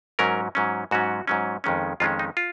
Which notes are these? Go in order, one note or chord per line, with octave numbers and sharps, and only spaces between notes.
G#2 F#3 C#4 A#4
G#2 F#3 C#4
G#2 F#3 C#4 F#4
G#2 F#3 C#4
F2 D#3 G#3 C#4
F2 D#3 G#3 C#4 F4
D#4
F4